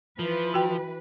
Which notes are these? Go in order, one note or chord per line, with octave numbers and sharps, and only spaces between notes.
E3 F3 B4
F#4 G5